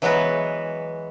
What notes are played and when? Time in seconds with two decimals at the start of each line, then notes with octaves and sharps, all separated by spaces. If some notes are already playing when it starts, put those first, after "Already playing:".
0.02 E3 F#3 G#3 B3 F#4 B4